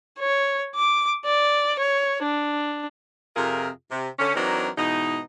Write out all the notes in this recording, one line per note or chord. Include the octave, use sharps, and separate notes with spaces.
C#5
D6
D5
C#5
D4
F2 C3 F4 G#4 A#4
C3
D3 C#4
E3 F#3 C4 D4 D#4 A#4
G#2 B2 E3 D#4